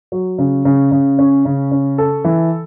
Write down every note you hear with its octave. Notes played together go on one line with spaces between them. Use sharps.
F#3
C#3
C#3
C#3
C#4
C#3
C#4
A4
E3